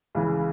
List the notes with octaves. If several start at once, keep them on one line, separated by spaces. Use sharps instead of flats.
C#2 C#3 E3